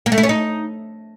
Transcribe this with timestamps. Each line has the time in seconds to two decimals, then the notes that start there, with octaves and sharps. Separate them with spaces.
0.06 A#3
0.12 A3
0.18 E4
0.23 C#4
0.29 D#4